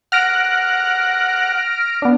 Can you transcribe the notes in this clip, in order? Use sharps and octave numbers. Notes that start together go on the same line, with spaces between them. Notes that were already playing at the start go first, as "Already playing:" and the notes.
F#5 F6 A#6 D7
B3 D4